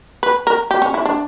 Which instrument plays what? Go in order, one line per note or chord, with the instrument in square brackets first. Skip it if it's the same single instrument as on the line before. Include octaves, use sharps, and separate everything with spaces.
[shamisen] B4
A#4
G4
C#4
E4
D4